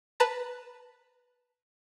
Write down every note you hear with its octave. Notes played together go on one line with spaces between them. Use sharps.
B4 A5 A#5